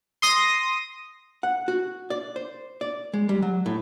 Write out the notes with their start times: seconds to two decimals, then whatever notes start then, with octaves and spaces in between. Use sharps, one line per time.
0.22 C6 D#6 A#6
1.43 F#5
1.68 F#4
2.10 D5
2.36 C5
2.81 D5
3.13 G#3
3.29 G3
3.42 F#3
3.66 A2